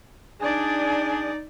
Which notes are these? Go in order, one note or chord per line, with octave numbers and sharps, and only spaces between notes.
D4 D#4 G#4 D5